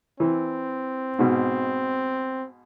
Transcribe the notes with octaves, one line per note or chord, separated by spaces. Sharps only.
E3 C4
G#2 B2